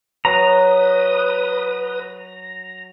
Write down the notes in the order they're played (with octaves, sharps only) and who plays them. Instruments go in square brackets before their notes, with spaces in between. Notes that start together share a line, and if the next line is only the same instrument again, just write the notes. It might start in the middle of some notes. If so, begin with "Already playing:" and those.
[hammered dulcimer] F#3 [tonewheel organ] B4 D#6 [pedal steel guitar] A#5